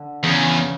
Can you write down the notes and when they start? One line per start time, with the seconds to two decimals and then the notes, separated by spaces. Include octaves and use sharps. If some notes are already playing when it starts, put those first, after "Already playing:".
Already playing: D3
0.23 E2 C#3